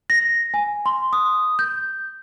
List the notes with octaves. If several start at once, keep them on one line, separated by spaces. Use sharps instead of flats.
A#6
G#5
C6
D#6
G6